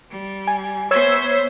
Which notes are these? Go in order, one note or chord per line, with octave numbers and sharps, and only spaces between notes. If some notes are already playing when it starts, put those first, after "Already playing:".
G3
G#5
B3 C5 C#5 E5 E6 G#6